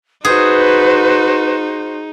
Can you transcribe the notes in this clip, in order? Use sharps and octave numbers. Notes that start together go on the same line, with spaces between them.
D#4 F#4 G#4 B4 C5